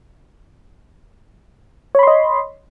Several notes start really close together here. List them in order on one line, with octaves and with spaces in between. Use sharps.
C#5 B5 C6 D#5